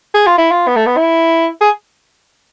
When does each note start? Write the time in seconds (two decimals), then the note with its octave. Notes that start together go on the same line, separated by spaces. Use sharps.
0.15 G#4
0.27 F4
0.38 E4
0.51 F4
0.67 B3
0.76 A3
0.86 B3
0.97 E4
1.61 G#4